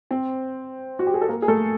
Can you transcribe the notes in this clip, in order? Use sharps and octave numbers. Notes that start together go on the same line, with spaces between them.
C4 C5
F#4
G4
G#4
A4
A#3 A#4
G#4
A3 A4